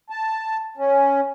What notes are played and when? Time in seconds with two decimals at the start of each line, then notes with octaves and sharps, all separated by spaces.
0.10 A5
0.77 C#4